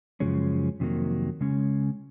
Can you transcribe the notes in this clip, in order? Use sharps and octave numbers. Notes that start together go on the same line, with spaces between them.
F#2 C#3 F3 G#3 C#4
F2 C3 D#3 F#3 A#3
C#3 G#3 C#4